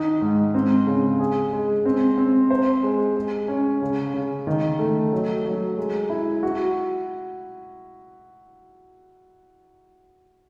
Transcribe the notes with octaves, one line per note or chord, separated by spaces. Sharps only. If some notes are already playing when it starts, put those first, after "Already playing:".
Already playing: D#3 D#4
G#2
C4
C#3
G#4
G#3
C4
C4
C5
G#3
G#3
C#4
C#3
C#3
D#3
A3
F#3
F#3
G#3
E4
F#4